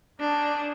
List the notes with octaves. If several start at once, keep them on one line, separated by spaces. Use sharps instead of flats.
A#3 D4 D#4 G#4 C#5